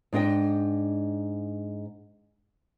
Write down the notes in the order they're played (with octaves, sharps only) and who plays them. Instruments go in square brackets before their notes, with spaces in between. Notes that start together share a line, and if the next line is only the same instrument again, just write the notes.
[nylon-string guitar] G#2 D4 D#5 G5